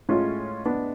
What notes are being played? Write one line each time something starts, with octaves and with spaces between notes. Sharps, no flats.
A2 G#3 C#4 F4
B3 D4